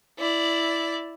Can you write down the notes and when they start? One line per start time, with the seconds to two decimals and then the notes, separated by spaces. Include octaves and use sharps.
0.18 E4 D5